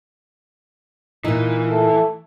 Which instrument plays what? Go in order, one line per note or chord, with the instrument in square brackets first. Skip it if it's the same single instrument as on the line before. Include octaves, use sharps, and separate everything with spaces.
[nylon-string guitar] A#2 D#4 [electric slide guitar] E3
[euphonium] A3